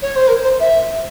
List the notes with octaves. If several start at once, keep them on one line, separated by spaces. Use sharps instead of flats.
C#5
C5
A#4
C5
E5